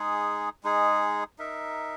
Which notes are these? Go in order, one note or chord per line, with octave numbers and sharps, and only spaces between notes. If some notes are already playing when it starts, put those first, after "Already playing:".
Already playing: G#3 D#4 G#4
G#3 D#4 G#4
D#4 A#4 E5